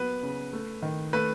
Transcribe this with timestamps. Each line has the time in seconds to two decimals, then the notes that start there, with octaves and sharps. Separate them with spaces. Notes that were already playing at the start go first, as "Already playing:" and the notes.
Already playing: F#3 B3 B4
0.23 C#3
0.53 A3
0.83 D#3
1.13 A3 B4